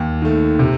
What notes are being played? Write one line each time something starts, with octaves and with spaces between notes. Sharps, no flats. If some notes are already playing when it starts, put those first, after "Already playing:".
Already playing: D#2
D#3 A3
C3